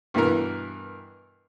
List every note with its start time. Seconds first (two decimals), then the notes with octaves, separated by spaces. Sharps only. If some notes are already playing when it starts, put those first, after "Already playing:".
0.14 G2 B2 E3 A#4